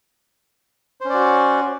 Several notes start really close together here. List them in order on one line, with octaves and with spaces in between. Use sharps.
C5 C#4 D5 F#4